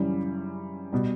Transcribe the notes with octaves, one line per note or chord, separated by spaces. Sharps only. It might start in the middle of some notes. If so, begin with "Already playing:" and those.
Already playing: F#2 C#3 E3 G3
B2 G3